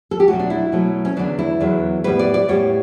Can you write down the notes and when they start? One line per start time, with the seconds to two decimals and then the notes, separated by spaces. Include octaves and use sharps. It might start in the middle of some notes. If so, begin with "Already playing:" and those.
0.11 A4
0.20 G4
0.28 B2 F#3 A3 F#4
0.39 D4
0.50 E4
0.72 B2 F#3 A3
1.05 C#4
1.16 E2 D3 F#3 B3 D4
1.39 E4
1.60 E2 D3 F#3 B3
2.04 A2 G3 B3 B4
2.19 D5
2.34 D5
2.48 A2 G3 B3 C#5